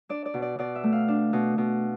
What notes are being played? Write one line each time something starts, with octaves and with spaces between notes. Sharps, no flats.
D4 D5
D5
B2
D5
B2 D5
E5
A3
F5
D4
B2
B2